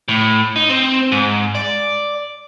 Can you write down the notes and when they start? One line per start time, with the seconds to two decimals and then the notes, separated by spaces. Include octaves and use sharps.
0.08 A2
0.56 D#4
0.69 C4
1.12 G#2
1.55 D5